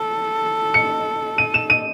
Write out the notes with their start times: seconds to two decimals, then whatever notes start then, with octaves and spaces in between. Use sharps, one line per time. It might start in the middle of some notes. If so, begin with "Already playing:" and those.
Already playing: A4
0.74 C#7
1.38 D#7
1.54 E7
1.70 D#7